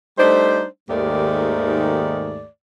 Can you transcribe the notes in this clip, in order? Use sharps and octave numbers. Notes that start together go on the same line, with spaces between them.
G3 A3 D4 D#4 C5
D#2 G#2 D#3 A3 G4 D5